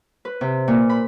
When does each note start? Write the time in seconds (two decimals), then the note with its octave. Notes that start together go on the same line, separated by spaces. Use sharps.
0.25 B4
0.41 C3
0.68 A#2
0.90 B5